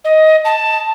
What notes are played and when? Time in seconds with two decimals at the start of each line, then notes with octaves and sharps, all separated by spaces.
0.04 D#5
0.45 A5